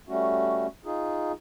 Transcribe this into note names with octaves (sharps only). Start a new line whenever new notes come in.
G3 A3 C#4 F#4
D#4 F4 G#4